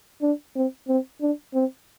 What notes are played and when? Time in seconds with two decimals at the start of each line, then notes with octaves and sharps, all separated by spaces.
0.22 D4
0.56 C4
0.88 C4
1.21 D4
1.54 C4